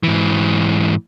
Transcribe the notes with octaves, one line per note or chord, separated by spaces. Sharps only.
G#2 E3